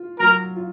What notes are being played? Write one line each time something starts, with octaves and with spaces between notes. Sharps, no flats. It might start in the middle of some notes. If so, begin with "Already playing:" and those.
Already playing: F4
F#3 A#4 A#5
F4